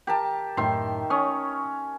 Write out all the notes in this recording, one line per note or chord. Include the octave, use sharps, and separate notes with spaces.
G4 A#4 A5
F#2 A2 D#3 E5 C6
C#4 C#6 D#6